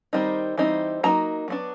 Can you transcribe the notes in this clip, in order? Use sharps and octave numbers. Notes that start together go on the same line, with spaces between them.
D#3 G3 C4 D#4
E3 G3 C4 D#4
F#3 A#3 D#4 A#5
F#3 B3 D4